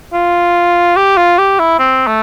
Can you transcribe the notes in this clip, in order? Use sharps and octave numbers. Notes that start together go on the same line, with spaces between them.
F4
G4
F4
G4
E4
C4
A3